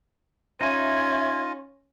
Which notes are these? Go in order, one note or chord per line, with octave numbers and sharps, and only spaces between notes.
C#4 D#4 F4 E5 G#5 G#6